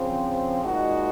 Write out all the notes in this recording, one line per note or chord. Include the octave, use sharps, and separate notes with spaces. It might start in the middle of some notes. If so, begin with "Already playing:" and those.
Already playing: C#3 F3 C4
A#2 G#3 D#4 F#4